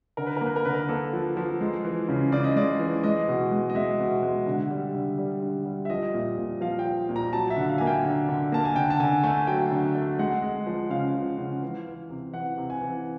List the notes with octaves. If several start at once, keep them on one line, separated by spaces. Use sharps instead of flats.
D3 A#4
B4
A#4
A#3 B4
A#4
D3 B4
A#4
A#3 A4
F3
F3
G#3
E3
C#3
C#3 D5
D#5
G#3 D5
E3
G#3 D#5
B2
G#3
D#5
G#3 E5
B2
G#3
D3
G3
D3
G3
D3
G3
E5
F3 D#5
A#2
A#2
F3 F5
G5
F3
A#2
A#5
F#3 A5
E5
D3
F5
A#3 G#5
G5
D3
D3
A#3 A5
G#5
D3 G5
A5
D3 G#5
A3 G#5
F#3 G5
D3
A3
G#3 F#5
G#3
F3
C#3 F5
F3
C#3
E3
E3
C3
E3 F#5
C3
G#5
E3